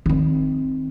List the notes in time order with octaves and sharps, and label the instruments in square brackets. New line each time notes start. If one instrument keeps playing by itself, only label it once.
[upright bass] D#3 C4